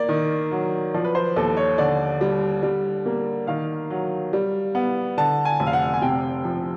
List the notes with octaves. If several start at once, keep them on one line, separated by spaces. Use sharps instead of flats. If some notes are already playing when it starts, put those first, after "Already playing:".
Already playing: A#3 D5
D#3
F#3
F3 D5
B4
C5
D#2 A4
C#5
D3 D5
G3
G3
A#3
D#3 F5
F#3
G3
B3
D3 A5
G#5
F1
F5
F#5
G#5
C3 G5
F3